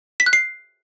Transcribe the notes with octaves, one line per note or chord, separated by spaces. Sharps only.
B6
F#6
C7